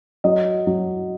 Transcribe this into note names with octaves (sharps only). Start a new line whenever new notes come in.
F#3 D#5
F#3